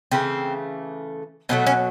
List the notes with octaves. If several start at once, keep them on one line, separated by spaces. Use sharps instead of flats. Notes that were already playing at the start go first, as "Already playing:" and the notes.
C#3 E3 A3 C4
B2 F#3 A3 C4
C#4